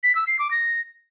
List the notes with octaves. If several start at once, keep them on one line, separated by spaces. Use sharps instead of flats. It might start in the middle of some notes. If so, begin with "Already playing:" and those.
B6
E6
C7
D6
A#6